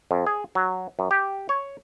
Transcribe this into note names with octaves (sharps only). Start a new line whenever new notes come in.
F2
G#4
F#3
F#2
G4
C#5